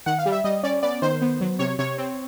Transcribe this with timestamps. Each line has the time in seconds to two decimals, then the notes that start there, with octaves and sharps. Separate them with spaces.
0.06 D#3 F#5
0.19 F5
0.26 G3
0.32 E5
0.44 G3 D#5
0.63 C#4 D5
0.83 B3 D5
1.02 D#3 C5
1.21 B3
1.41 F#3
1.59 C3 C#5
1.79 C3 C#5
1.98 C4